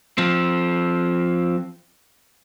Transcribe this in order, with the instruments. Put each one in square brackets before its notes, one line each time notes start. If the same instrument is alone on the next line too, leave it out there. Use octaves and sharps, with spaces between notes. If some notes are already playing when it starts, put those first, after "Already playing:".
[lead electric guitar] F3 C4